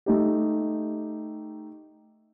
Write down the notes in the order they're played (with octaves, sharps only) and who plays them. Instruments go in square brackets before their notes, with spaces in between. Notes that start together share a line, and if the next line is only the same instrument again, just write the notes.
[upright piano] A3 D#4 G4